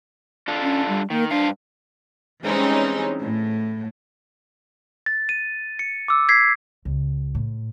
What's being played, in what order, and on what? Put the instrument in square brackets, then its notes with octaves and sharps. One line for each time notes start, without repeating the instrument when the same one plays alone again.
[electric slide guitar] D4 F4 A4
[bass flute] C#4
G3
[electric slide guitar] D#3 [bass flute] A#3
[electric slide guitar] G2 C5 F5 [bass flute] D4
[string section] E3 G3 G#3 C4 C#4 D#4
A2
[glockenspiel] A6
D#7
C#7
D6 E6
G#6 B6 C7
[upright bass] C#2
A2